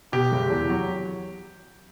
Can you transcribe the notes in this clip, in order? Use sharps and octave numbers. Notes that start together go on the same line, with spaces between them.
B2 G4
F#1
E2
F#3